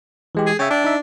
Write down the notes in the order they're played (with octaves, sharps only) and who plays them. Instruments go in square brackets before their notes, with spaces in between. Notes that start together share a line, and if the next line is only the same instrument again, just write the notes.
[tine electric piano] E3 G#3 G4
[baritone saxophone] G#4
[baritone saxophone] C#3 [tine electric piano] E5 G5
[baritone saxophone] D4
[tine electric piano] D#4 E5